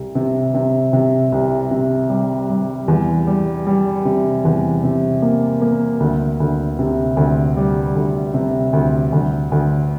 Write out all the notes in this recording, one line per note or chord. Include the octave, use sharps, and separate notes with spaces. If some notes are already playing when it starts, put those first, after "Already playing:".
Already playing: C2
C3
C3
C3
C2
C3
G3
G3
E2
G3
G3
C3
E2
C3
A#3
A#3
D2
D2
C3
D2
G3
D2
C3
D2
D2
D2